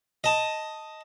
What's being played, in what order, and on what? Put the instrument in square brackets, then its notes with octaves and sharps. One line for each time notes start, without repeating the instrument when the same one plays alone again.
[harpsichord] D#5 A5